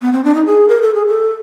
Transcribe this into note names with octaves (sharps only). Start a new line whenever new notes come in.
B3
C4
D4
D#4
G#4
A#4
A4
G#4
A4